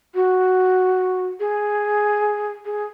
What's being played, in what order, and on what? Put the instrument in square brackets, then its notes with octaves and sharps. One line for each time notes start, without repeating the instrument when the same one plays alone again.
[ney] F#4
G#4
G#4